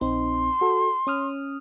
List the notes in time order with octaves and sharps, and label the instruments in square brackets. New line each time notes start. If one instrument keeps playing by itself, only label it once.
[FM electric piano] A#1 C4 D#4 [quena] C6
[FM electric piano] F#4 A4
C#4 D#6 F6